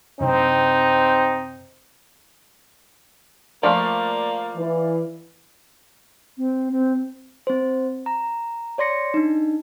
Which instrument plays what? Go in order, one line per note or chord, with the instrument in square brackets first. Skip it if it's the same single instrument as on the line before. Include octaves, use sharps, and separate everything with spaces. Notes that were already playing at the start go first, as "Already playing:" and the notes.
[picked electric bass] F#2 C3 D4 [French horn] C4 [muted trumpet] D#4
[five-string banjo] F3 A3 [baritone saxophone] A#3 [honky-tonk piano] D5 F5
[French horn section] E3
[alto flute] C4
C4
[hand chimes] C4 C5
A#5
C#5 D5 C6 A#6 C#7
D4 D#4